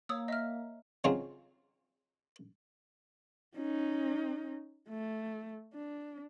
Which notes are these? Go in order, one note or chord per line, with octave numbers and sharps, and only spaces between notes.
A#3 C#5 D#6 E6
D#5 E5 F6
C#3 F#3 C4 D#4 F4 G#4
C#4 D#4
A3
D4